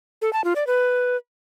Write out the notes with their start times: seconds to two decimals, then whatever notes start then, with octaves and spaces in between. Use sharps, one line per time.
0.22 A4
0.33 A5
0.44 F4
0.56 D5
0.67 B4